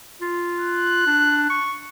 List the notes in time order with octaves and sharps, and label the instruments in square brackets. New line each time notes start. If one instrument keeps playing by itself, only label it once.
[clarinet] F4
[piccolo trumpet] F#6
[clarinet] D4
C#6